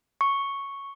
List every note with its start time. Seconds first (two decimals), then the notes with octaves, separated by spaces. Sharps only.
0.21 C#6